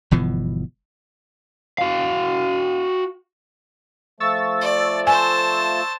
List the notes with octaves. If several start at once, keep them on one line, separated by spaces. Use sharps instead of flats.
G1 B2 E3 F3
F#4 F5
F3 A3 C#6 E6 A6
D5
C5 G#5 A5